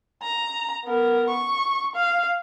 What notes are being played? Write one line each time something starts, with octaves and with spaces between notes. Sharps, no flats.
A#5
B3 A#4
C#6
F5